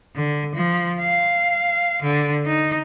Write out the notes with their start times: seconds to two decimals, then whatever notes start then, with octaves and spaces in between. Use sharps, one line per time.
0.15 D3
0.55 F3
1.01 F5
2.02 D3
2.46 D#4